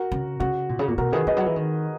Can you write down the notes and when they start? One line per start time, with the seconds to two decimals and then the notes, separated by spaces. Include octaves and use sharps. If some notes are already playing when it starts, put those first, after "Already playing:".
Already playing: F#4 A#4
0.12 C#3
0.40 C#3 F#4
0.69 A#2
0.79 C#3
0.88 A#2
0.98 B2 F#4 A#4
1.12 D#3 G#4 B4
1.27 D#3 B4 D#5
1.37 F#3
1.46 E3
1.56 D#3